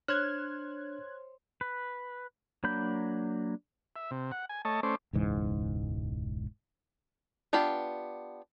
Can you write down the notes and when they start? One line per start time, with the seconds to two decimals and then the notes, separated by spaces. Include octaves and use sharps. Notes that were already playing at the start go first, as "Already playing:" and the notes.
0.08 D4 C5 C#5 C6 F6 F#6 G#6
1.61 B4
2.64 F#3 A#3 D4 B5 G6
3.96 E5
4.11 C3
4.32 F#5
4.49 G#5
4.65 A3 C#5 D#5 A5
4.83 A3 C#4 C5 D5
5.13 E1 C#2 G#2 E3
7.53 B3 D4 F4 G4 B5